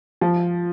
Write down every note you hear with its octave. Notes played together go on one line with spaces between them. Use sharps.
F3